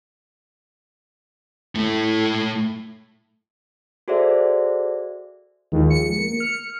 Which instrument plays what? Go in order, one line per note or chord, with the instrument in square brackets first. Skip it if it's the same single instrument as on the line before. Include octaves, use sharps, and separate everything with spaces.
[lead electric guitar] A2 A3
[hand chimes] F#4 G#4 A4 C5 D5 E5
[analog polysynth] D#2 [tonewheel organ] F3 G#3
[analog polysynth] C#7
[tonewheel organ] A#3
F6